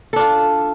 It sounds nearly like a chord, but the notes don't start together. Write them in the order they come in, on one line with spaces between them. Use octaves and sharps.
A4 D4 F4